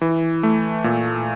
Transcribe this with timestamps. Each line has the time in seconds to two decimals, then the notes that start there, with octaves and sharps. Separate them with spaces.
0.01 E3
0.43 A3
0.84 A#2